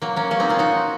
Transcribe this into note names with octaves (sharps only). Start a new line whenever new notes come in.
F#3 A#3
A#3 C#4
A#3 C#4
C4 D#4
C#4 F4
D#4 F#4